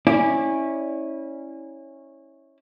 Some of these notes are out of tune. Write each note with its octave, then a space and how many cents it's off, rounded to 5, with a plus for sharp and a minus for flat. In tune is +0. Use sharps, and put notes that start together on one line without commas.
C#4 -15 E4 -20 D5 +0